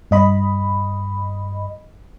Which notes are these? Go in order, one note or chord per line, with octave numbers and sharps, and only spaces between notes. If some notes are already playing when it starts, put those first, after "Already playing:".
G2 D#5 B5